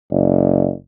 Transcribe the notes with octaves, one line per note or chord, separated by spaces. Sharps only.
F#1